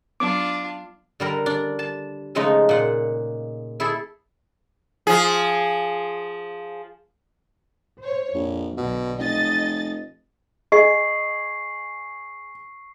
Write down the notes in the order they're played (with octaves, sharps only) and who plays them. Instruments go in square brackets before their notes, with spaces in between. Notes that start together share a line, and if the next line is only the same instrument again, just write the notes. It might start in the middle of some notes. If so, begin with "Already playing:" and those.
[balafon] F#3 B3 [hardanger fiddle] D4 F4 [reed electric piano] D6
[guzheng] D3 G3 A#4
D4
A5
C#3 F3 G#3 A3 D#4
A#2 F#5
E4 G#4 A4
[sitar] F3 G#4
[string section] C5 C#5
[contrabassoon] A#1 [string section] F2
[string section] B1 D3 [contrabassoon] B2
[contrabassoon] F1 [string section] D#5 A6
[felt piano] G#4 [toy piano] D#5 [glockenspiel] C#6 C7